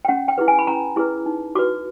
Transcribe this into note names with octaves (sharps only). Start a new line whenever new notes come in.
G5
C#4 F#5
G5
E4 G#4 B4
G#5
B5
C#4 A#5
E4 G#4 B4
D#4
F#4 B4 D6